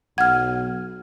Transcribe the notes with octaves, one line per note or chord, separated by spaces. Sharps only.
B1 F#5 F6 G#6